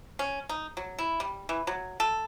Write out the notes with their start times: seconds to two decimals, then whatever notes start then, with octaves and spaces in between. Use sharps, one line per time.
0.19 C#4
0.49 D#4
0.77 F#3
0.98 E4
1.20 G3
1.49 E3
1.67 F#3
2.00 A4